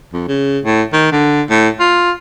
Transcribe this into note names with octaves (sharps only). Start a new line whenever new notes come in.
F2
C#3
A2
D#3
D3
A2
F4